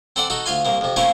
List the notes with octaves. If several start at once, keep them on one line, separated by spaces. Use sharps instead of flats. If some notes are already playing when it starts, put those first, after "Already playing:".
C4 A4 C5 D5 F#5
D#4 F#4 A4
D2 F4 F5 G#5 C6
C2 A#3 C4
F2 C3
A3 A#3 C4 C#4 E4 F4